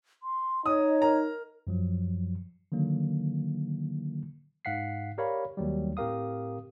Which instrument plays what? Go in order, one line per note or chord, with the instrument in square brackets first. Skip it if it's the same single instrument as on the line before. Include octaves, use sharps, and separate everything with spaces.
[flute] C6
[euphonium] D#4 [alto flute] C#5 [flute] D#5 [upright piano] D#6
[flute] A#4 [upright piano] A#5
[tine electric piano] F#2 F3 F#3
D3 D#3 F#3 A#3
G#2 F5 F#5 B6 C7
G4 A#4 C#5 D5 F5 B5
D#2 F#3 G3
A2 C4 G4 A#4 F5 D#6